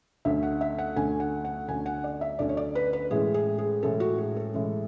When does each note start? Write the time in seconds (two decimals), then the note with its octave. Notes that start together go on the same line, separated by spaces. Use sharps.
0.25 D2 D3 A3 C#4 E5
0.43 F#5
0.61 E5
0.78 F#5
0.96 D2 D3 A3 C#4 G#5
1.20 F#5
1.45 F#5
1.68 D2 D3 A3 C#4 G#5
1.86 F#5
2.04 D5
2.21 E5
2.39 D2 D3 A3 C#4 D5
2.49 C#5
2.57 D5
2.75 B4
2.93 B4
3.11 A2 E3 G#3 C#4 G#4
3.34 G#4
3.59 G#4
3.82 A2 E3 G#3 C#4 A4
4.00 F#4
4.18 G#4
4.36 A4
4.54 A2 E3 G#3 C#4